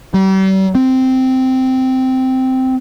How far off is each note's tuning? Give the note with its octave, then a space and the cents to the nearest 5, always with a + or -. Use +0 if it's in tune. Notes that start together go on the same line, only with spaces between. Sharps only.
G3 -40
C4 -10